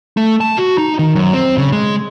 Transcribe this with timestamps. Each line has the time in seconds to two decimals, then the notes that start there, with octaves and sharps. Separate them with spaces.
0.17 A3
0.41 A5
0.58 F#4
0.78 D#4
0.99 D#3
1.15 F#2
1.34 C4
1.58 C#3
1.72 G#3